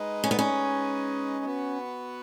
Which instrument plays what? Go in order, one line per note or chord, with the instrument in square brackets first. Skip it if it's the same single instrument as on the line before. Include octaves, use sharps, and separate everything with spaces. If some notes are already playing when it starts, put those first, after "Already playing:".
Already playing: [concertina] G#3 D#4 B4 D#5
[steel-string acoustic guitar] C#4
B3
C#4
[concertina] B3 F#4 B4